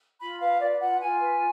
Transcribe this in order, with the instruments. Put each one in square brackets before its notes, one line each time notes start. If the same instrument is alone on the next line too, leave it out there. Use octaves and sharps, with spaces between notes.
[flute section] F4 B5
B4 F5
B4 D5
F4 F#5
F4 G#5
B4